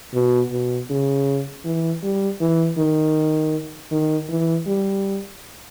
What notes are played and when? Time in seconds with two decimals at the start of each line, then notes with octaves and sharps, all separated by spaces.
0.14 B2
0.52 B2
0.90 C#3
1.65 E3
2.03 G3
2.41 E3
2.78 D#3
3.91 D#3
4.29 E3
4.67 G3